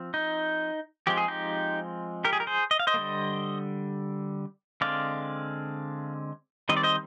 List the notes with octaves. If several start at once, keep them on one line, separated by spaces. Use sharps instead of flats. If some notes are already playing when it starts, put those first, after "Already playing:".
Already playing: F3 C4
D#4
F3 G#3 C4 G4
G#4
D#4 G4
G4 A#4
G#4
A#4
G#4 C5
D#5
F5
C5 D#5
D3 G3 A#3
D3 G#3 C4 D5 F5
D#3 G3 C4 D#5
D5
C5 D#5